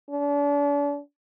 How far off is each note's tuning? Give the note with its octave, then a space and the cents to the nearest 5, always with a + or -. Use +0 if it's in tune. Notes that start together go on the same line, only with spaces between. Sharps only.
D4 -40